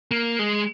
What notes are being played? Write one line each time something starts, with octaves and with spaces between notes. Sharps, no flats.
A#3
G#3